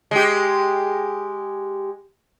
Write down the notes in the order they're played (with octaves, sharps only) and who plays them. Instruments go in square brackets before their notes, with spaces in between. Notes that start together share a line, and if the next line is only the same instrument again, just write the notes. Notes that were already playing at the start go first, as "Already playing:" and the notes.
[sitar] G#3 G4